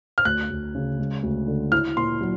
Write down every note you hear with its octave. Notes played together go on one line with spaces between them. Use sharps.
F6
D2 F#6
D2
C#3
G#3
D2
D3
E4 F6
A#2 C6
F#3